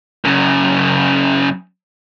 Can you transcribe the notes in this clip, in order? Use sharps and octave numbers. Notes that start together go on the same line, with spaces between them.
F#2 C#3